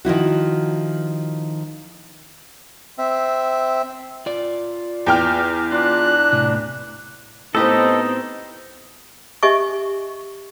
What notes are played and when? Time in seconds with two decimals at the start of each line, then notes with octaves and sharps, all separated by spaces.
0.05 D#3 F3 E4 F#4
2.98 C4 E5
4.26 F4 D5
5.07 E2 G5 F6
5.72 D4 F4 F#6
6.33 A2 C3
7.55 A2 B3 C4 D#4 G4 A4 B4 D#5
9.43 G4 D#5 E5 G#5 C#6